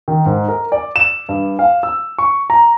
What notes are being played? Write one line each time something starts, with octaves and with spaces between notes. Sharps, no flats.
D#3
G#2
A#4
D5
E7
G2
F5
E6
C#6
A#5